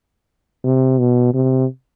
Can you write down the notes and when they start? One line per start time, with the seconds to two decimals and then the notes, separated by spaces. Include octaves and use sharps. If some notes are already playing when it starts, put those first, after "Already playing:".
0.64 C3
0.99 B2
1.34 C3